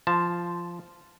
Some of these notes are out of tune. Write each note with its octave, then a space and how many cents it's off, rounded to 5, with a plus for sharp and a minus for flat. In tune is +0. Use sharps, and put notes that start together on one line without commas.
F3 -10 A5 +0